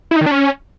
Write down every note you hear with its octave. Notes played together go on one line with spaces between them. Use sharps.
E4
D#4
D#3
D4
C#4